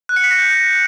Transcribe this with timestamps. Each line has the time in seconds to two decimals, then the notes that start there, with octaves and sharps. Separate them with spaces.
0.09 F#6
0.16 C#7
0.24 B6
0.31 A#6
0.38 G6